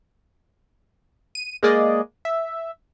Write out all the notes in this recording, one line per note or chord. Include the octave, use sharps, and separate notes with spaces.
D#7
G#3 A#3 G#4 D5 D#5
E5